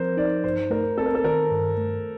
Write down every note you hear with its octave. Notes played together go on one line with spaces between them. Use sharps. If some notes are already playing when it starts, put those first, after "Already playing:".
Already playing: F3 C4 A#4 C5
D#4 D5
G2 C5
A3 A#4
C4 A4
A#4
A4
D#3 A#4
G2
A3